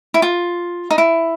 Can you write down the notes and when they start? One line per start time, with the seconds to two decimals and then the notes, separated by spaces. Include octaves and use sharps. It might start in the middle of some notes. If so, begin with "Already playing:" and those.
0.14 E4
0.22 F4
0.91 D#4
0.98 E4